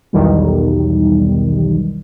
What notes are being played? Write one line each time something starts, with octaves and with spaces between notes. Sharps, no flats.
B1 E2 D#3 G3